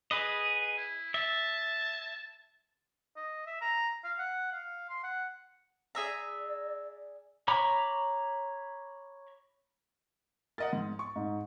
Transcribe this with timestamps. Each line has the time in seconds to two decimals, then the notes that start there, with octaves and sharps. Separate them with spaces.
0.11 G#4 B4 D#5
0.76 E4
1.14 E5 A5
3.16 D#5
3.47 E5
3.61 A#5
4.04 F5
4.19 F#5
4.52 F5
4.90 C6
5.03 F#5
5.95 G#4 D5 E5 A#5
7.48 C#5 A#5 B5 D6
10.58 A#4 D#5 F#5 A6
10.73 G#2
10.99 C#6
11.16 G#2